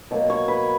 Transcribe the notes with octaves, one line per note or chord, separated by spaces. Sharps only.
B2 F#3 A#3
C#5
B4